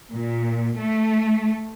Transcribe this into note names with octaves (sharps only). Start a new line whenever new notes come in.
A#2
A3